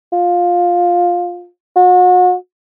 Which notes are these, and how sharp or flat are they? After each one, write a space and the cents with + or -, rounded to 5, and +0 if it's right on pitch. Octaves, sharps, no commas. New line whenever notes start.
F4 +15
F#4 -35